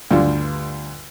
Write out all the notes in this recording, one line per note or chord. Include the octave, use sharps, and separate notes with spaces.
D2 G2 D4 F4